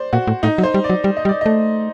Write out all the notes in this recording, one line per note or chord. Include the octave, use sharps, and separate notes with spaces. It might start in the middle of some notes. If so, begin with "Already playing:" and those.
Already playing: C5 D5
A#2 F#4
A2
A2 D#4
F#3
C5
G3
D5
F#3
G3
D#5
G3
D5
A3 D#5